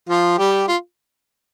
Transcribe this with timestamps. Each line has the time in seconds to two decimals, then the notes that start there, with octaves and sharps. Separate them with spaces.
0.09 F3 F4
0.38 G3 G4
0.68 F4